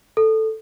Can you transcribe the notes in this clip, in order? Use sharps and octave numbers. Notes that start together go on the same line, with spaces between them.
A4